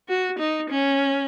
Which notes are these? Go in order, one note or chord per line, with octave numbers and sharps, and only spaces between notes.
F#4
D#4
C#4